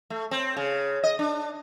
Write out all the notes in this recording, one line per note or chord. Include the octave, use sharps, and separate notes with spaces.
A3
C4
C#3
D#5
D4